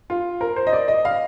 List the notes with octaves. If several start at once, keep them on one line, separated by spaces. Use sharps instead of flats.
F4
A#4
C5
D#5
D5
D#5
F5